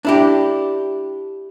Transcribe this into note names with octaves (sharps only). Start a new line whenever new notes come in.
D4 E4 G4